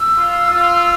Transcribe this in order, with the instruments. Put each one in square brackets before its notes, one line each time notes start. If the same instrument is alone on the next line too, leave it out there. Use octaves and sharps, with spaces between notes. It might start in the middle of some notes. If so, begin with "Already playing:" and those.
Already playing: [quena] E6
[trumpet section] F4
F4